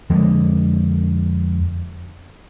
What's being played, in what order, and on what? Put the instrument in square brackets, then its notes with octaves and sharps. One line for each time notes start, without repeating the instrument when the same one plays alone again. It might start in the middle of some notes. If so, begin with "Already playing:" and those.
[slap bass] F2 D3 G#3